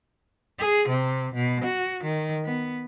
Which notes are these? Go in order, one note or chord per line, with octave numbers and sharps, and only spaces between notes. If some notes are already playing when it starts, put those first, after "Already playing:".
G#4
C3
B2
F#4
D#3
B3